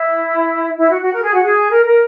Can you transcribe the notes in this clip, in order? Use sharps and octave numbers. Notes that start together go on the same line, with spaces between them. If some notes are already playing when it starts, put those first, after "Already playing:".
Already playing: E4
E4
F#4
F#4
A#4
G#4
F#4
G#4
A#4
A#4